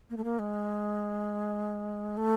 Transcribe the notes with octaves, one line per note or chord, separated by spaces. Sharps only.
A#3
A3
A#3
G#3
A3